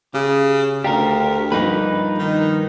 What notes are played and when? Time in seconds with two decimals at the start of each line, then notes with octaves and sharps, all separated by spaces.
0.14 C#3 G4
0.84 D2 G4 A#4 D5 F5 A#5
1.52 G2 F3 A#3 D#4 B4
2.19 D#3